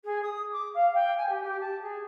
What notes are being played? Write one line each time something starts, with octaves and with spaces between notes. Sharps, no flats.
G#4
D#6
D6
F5
G5
G#5
G4
G4
A5
G#4